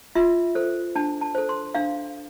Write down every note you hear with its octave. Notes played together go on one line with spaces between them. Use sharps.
F4 E5
A4 C5
D4 A5
A5
A4 C5
C6
D4 F5